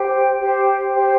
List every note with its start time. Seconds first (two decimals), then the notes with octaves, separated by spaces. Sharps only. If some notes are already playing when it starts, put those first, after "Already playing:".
Already playing: G4 C5 G5
0.39 G4 C5 G5
0.93 G4 C5 G5